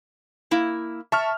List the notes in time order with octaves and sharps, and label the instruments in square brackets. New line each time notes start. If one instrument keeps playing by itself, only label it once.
[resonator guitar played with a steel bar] A#3 E4
[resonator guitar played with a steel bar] E5 [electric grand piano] A5 C#6 F6